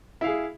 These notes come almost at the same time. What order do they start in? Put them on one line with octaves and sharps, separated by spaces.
E4 F5 G#4